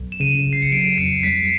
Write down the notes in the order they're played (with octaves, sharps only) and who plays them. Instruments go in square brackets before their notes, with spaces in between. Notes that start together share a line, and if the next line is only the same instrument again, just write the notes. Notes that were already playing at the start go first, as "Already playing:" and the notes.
Already playing: [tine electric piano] B1
[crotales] E7
[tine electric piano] C#3 [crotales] D#7
[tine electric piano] G1
[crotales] C7
C#7
[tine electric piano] F#3 [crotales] D7
[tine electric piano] F2 [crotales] C7
[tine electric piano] G3 [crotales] B6